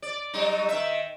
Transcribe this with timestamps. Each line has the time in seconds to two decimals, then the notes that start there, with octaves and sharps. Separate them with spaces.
0.02 D5
0.34 F#3 G3 D#4
0.69 D#3 E5